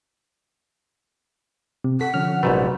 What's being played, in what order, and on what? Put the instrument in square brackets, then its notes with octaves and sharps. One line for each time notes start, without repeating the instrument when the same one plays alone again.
[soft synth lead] C3
[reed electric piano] A4 [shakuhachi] F#5 [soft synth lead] B6
[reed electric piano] D3 F3 C#4 [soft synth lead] F6
[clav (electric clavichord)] A#1 G#2 A3 [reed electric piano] C3 F#3 F#4 [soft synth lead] B4